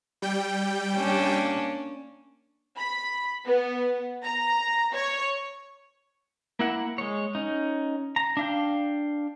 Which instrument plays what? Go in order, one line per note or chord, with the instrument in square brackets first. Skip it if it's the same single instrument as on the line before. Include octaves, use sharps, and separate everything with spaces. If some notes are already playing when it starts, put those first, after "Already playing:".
[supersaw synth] G3 G5
[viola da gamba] A#3 C#4 D4
[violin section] B5
B3
A#5
C#5
[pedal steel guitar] A#3 E4 F#5
G#3 C#5
C#4 D#4
A#5
D4 F5 G5